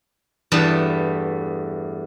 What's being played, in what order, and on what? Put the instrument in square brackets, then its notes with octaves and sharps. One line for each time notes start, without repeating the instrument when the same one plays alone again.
[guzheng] E2 G2 A3 B3 A5